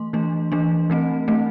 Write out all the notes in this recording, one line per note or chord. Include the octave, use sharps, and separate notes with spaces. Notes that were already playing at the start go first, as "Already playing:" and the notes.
Already playing: E3 A3 C6
E3 A3 D4
E3 A3 D4
E3 A3 C4
E3 A3 C4